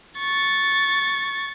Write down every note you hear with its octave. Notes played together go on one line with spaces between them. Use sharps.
C#6 A6